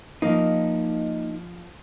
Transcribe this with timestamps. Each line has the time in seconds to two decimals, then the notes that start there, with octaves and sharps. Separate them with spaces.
0.22 F3 A#3 D#4 D#5